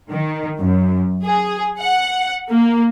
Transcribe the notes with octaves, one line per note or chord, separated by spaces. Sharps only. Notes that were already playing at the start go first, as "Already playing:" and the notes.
D#3
F#2
G#4
F#5
A#3